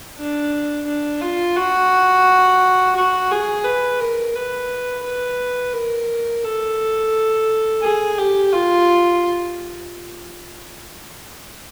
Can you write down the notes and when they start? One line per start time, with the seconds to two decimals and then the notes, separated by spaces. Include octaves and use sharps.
0.18 D4
0.87 D4
1.21 F4
1.56 F#4
2.96 F#4
3.31 G#4
3.65 B4
4.00 A#4
4.36 B4
5.04 B4
5.73 A#4
6.44 A4
7.83 G#4
8.18 G4
8.53 F4